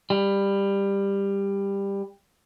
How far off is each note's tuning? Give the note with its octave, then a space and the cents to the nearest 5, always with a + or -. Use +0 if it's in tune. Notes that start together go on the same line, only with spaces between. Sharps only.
G3 +15